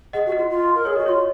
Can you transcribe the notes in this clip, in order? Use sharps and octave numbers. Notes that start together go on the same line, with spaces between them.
G#4 D#5 F#5
F#4
D#5 F#5
F4
F4
A#4
G#4 C#5
F#4 D#5
F4 C#5